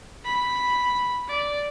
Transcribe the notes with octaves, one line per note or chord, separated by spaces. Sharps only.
B5
D5